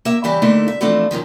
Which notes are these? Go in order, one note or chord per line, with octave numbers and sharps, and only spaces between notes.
A#3 E5
C#3 E3 G3 E4 G4
D3 A3 A#3 D#4 E4
E5
E3 F3 A3 C4 D4
F#2 B2 D#3 F3